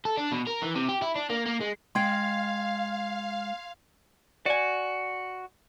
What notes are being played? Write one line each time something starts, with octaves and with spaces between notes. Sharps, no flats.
A4
D4
B2
A#4
E3
C3
G4
E4
D4
A#3
A#3
G#3
G#3 F5 G5 C6 G#6 C7
F#4 D5 G#5